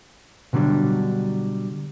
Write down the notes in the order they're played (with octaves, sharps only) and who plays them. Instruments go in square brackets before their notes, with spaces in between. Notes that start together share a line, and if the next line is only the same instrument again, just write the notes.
[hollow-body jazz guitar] B2 D3 F#3 G3 D4